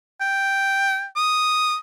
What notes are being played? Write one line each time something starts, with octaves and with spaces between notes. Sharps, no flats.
G5
D#6